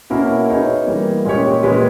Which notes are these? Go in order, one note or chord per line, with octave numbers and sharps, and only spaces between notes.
B2 A#3 C#4 E4 A#4
B3 D#4 G#4 C#5
E3 G3 A#3
A#2 G#3 C#4 G4 C#5
A#2 G#3 B3 G4 B4